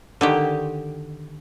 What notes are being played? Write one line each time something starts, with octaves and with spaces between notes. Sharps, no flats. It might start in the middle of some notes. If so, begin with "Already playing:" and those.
D3 D#3 G4